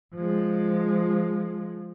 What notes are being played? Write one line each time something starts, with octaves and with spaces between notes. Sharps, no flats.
F3 G#3